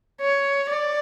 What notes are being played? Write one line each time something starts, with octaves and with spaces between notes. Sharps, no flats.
C#5
D5